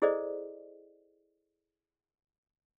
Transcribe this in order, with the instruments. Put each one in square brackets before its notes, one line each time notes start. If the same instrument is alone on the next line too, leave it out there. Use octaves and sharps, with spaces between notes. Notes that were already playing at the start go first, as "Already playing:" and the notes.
[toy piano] E4 G#4 A4 C5 D5 D#5